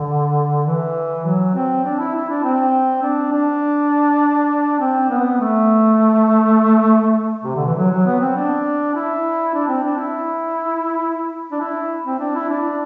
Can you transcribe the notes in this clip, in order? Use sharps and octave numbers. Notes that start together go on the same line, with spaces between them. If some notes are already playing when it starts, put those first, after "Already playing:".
Already playing: D3
E3
F#3
C4
D4
E4
E4
D4
C4
D4
D4
C4
B3
A3
C3
D3
E3
F#3
F#3
B3
C4
D4
E4
D4
C4
D4
E4
D4
E4
C4
D4
E4
D4